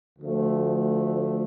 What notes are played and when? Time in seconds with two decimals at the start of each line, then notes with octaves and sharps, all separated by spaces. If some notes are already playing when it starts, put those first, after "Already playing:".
0.19 D2 D3 F3 A3